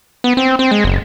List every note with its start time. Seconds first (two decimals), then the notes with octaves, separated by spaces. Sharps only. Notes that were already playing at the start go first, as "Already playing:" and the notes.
0.24 B3
0.37 C4
0.59 C4
0.71 G#3
0.84 F#1